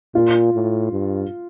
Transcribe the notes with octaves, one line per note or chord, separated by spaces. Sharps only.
A#2 F4
A2
G2